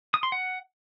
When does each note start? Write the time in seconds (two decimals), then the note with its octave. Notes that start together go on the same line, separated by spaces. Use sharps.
0.14 D#6
0.23 C6
0.32 F#5